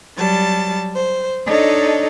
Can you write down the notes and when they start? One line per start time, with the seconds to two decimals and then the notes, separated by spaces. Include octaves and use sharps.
0.18 F#3 G3 A5 A6
0.95 C5
1.48 D4 D#4 A4 C#5 D#5